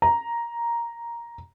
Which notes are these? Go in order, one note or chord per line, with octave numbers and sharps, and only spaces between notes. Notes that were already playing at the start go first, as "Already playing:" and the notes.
A#5